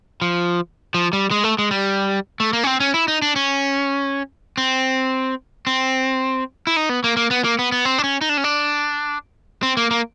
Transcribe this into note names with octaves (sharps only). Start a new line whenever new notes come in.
F3
F3
G3
G#3
A3
G#3
G3
A3
A#3
C#4
C4
C#4
E4
D#4
D4
C#4
C4
C4
E4
D#4
B3
A#3
A#3
B3
A#3
B3
B3
C4
D4
C#4
D#4
D4
C#4
D4
C4
A#3
A#3